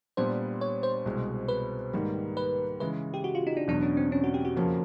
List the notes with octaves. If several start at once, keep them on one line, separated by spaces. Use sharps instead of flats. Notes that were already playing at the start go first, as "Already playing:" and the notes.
A#2 G3 B3 D4 C5
C#5
C5
C2 B2 G#3
B4
G#2 D#3 G3 A#3
B4
C#3 E3 G#3 B4
G4
F#4
F4
D#4
D4
E2 B2 F#3 B3 D4
C#4
C4
C#4
F#4
G4
F#4
F2 C#3 F3 A#3 C#4